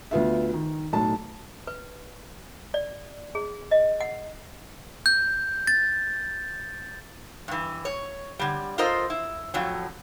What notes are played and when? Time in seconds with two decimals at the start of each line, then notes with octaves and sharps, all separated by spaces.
0.11 D2 B3 F4 E5
0.54 D#3
0.93 B1 A2 A5
1.67 B4
2.74 D5
3.35 G#4
3.71 D#5
4.01 F#5
5.06 G6
5.67 A6
7.48 G2 E3
7.85 C#5
8.39 D3 G3
8.78 F4 A4 A#4 C5 D#5
9.10 E4
9.54 F2 A2 F#3